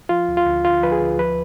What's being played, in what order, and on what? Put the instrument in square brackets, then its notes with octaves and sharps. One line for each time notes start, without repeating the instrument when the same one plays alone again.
[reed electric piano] F3 F4
D2
F4
D2
D3 F4
F3 B4
G#4
D2
F3 B4